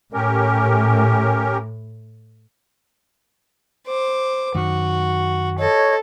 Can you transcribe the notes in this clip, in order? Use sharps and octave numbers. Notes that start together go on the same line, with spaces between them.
A2 C#4 G4 A#4
C5 D6
F#2 D#3 F#4
A4 C#5 D#5